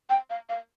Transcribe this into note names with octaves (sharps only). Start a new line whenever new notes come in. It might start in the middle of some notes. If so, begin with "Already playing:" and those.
G5
F5
F5